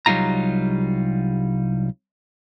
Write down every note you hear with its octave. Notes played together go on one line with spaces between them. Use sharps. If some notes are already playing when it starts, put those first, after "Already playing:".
C2 F#3 G3 D#4 F4 A#5